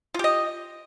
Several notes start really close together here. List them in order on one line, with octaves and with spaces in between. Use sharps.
F4 G4 D#5